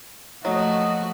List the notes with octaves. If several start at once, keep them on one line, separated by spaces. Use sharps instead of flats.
F3 F#3 A3 F#4 D#5